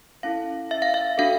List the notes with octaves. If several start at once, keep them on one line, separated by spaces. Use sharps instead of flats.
C#4 E4 A4 F5
E5
F5
E5
D4 F#4 A4 F5